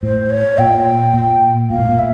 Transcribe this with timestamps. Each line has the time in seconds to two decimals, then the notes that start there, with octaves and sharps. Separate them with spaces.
0.02 A2 C5
0.30 C#5
0.58 A#2 G5
1.14 A#2
1.70 A#2 F5
1.79 A2
1.89 A#2
1.98 E5